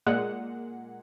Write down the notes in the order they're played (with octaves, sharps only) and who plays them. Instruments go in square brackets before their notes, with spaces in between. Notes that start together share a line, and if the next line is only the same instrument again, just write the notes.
[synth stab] A#2 G#3 F#5